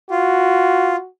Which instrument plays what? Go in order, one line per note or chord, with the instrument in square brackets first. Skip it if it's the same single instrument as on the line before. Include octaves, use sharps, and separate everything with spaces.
[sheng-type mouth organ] F4 [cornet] F#4